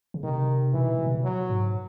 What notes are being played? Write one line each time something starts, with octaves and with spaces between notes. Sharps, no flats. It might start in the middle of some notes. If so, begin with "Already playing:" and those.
C#3
C3 D#3
B2 E3
B2
C3
B2
F#3
G#2